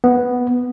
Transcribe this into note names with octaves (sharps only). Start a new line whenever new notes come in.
B3